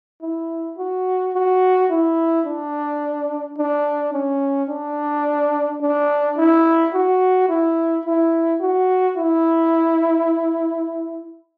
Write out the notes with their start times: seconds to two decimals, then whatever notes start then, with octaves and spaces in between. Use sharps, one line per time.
0.22 E4
0.78 F#4
1.34 F#4
1.91 E4
2.46 D4
3.58 D4
4.13 C#4
4.69 D4
5.82 D4
6.38 E4
6.94 F#4
7.49 E4
8.06 E4
8.61 F#4
9.17 E4